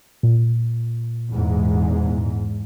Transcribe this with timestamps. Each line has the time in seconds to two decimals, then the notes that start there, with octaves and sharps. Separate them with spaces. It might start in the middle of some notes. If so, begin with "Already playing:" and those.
0.23 A#2
1.29 E2 G#2